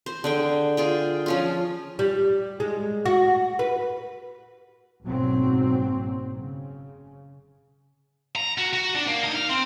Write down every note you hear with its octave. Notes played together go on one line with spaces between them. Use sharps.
C5
D3 G#4 G5
F4 G#4 G5
F3 C#4 F4
G3
G#3
F#4
B4
F#1 G#2 B2 F#3 C4
C#3
A#5
F#4
F#4
D4
A#3
D#4
F5
C4